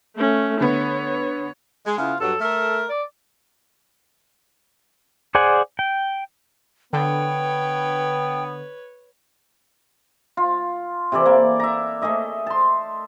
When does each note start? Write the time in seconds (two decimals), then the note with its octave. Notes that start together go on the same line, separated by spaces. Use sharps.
0.17 A3 C#4
0.61 D3 B3 C#5
1.86 G#3
1.98 C#3 B3 E4 F4
2.20 G2 F#3 A4
2.41 A3 A4 A#4
2.89 D5
5.35 G#4 C5 D5 F#5 G#5
5.79 G5
6.93 D3 B3 B4 C#5 G5
10.37 F4
11.12 C3 E3 A4 D5
11.26 A#3
11.60 E5 A#5
12.01 A3 G#4 D#5 E5
12.46 A5 C6